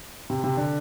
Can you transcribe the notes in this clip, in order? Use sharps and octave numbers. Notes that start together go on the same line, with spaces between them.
C3
C3
D3